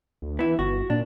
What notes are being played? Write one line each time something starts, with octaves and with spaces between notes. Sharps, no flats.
D2
E3 B3 E4
G1 F#4
A#2 D4